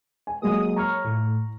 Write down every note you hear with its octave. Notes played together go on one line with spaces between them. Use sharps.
G#5
F#3 G#3 A#3 D#6
C#5 A#5 C#6 F6
A2